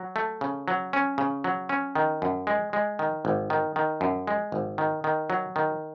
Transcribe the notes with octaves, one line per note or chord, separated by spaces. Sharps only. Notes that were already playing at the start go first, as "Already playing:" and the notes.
Already playing: F#3
A3
C#3
F#3
C#4
C#3
F#3
C#4
D#3
F#2
G#3
G#3
D#3
G#1
D#3
D#3
F#2
G#3
G#1
D#3
D#3
F#3
D#3